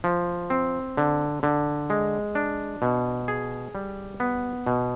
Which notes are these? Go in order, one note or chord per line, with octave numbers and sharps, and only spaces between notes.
F3
C4
D3
D3
G#3
D4
B2
G#4
G3
B3
B2